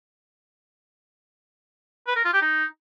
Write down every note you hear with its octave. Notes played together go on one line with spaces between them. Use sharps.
B4
A#4
F4
G4
D#4